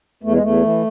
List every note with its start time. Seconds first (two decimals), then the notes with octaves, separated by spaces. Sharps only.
0.23 E2 A3
0.33 G#3
0.43 E2 A3
0.62 E3